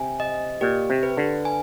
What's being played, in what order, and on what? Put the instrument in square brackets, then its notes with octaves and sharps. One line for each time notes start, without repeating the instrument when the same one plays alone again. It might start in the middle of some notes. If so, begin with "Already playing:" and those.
Already playing: [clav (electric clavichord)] C3 [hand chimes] G#5
[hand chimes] D#5
[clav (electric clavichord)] A#2 [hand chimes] G4
[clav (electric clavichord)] C3
[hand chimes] B4
[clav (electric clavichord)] D3
[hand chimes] G#5